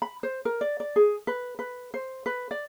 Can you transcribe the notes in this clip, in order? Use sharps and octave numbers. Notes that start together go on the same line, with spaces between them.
B5
C5
A#4
D5
D5
G#4
B4
B4
C5
B4
D5